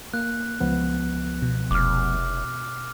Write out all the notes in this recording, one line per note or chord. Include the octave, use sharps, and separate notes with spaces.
A#3 F#6
C#2 F3 B3
B2
F1 D6 F6